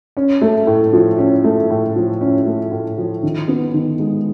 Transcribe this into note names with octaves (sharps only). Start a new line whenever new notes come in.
C#4
A3
A2
F3
C#4
A3
A2
F3
C#4
A3
A2
F3
D#3
B3
D#3
G#3